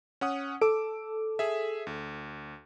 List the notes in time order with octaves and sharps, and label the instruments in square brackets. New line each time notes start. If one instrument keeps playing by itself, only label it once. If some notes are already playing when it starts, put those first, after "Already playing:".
[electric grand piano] C#4 F#5 D#6
[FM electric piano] A4 [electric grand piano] D6 E6 D7
[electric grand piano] G#4 E5
D2